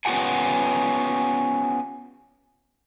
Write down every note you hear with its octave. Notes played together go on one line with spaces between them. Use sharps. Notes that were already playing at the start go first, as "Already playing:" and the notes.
B3 C#4 F4 G4 F#5 G#5